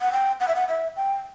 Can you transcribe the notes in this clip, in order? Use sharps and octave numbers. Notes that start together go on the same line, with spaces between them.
F#5
G5
F#5
E5
F#5
E5
G5